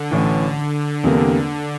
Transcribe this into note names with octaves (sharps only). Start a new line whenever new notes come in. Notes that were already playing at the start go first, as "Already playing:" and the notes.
Already playing: D3
A1 A2 E3
E2 C3 G3 A#3